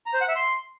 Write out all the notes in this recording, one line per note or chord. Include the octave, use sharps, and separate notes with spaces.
A#5
C5
F#5
E5
C6